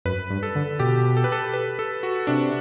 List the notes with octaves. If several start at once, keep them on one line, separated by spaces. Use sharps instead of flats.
F#2 B4
G2
A4
D3
B2 G4
A4
B4
A4
B4
A4
F#4
C3 D4